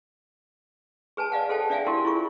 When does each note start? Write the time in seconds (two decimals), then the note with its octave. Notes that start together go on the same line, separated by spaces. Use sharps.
1.17 G#4 B4 G#5 A5
1.32 D5 D#5 F5 F#5
1.49 G#4 A4 C5 G5 A5
1.70 D4 D5 E5 F5 G5 G#5
1.87 E4 F#4 G4 A#4
2.05 E4 F4 G#4 C#6